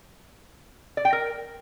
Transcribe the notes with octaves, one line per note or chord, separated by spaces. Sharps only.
D5
G5
A#4